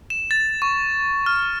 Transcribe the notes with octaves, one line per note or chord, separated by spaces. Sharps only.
E7
A6
C#6
F6